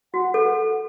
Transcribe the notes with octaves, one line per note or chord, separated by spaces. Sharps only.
F#4 F#5
A4 F#5